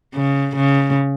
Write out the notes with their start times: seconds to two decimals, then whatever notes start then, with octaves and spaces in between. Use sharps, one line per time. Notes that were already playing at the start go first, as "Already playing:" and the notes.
0.15 C#3
0.56 C#3